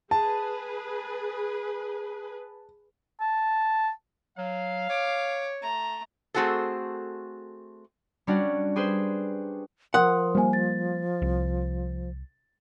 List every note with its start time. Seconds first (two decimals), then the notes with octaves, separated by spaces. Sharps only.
0.11 G#4 B4 A5
3.21 A5
4.38 F#3 F5
4.89 C#5 D6
5.62 A3 A#5
6.34 A3 C4 F#4 G#4 A4
8.27 G3 C#4 D4 F#4
8.76 G4 G#4 B4 C5
9.94 F3 A#4 F#5 C6 D#6
10.35 G3 A#3 C5 G#5
10.53 A6
11.22 C2